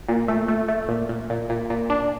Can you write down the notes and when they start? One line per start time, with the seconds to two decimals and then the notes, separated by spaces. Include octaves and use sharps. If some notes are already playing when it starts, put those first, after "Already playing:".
0.09 A#2
0.28 A3
0.48 A3
0.68 A3
0.88 A#2
1.09 A#2
1.30 A#2
1.50 A#2
1.70 A#2
1.90 D4